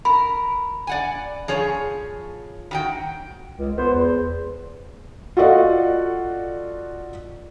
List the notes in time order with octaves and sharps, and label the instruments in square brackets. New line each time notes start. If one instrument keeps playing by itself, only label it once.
[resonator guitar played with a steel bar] A#4 [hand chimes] B5
[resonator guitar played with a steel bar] D5 F#5 G#5
F3 G#4 C#5
D#3 F#4 G5
[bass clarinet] C#2
[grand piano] B3 [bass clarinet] C5
[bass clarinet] E2
[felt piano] F4 F#4 A4 D5 D#5 F#5